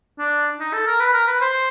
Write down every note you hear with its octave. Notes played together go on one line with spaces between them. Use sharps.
D4
D#4
A4
A#4
B4
A#4
B4
C5